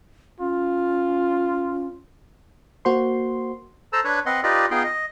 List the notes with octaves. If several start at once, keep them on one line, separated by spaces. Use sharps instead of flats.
C#4 F4
A#3 F#4 C5 C6
A4 C5 A5 A#5 E6
D4 B4 C#5
C4 B4 D#5 F#5 C6
D#4 F4 G4 B4 D5 D#5
B3 D#4 F4 G#4 G5 C6
D#5